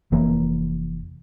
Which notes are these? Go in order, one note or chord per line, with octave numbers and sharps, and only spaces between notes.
F1 E3 A#3